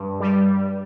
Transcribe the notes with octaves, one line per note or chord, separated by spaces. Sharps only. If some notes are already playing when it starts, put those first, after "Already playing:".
Already playing: G2
G3